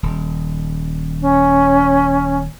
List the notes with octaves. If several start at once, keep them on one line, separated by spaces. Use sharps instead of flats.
D#1
C#4